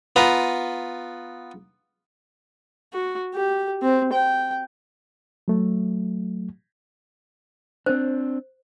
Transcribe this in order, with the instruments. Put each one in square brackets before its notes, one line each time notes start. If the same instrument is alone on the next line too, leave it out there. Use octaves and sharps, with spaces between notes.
[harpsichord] B3 F4 B4 A#5
[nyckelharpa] F#4
G4
C4
G5
[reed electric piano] F#3 A3
[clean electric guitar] C4 D4 [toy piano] C5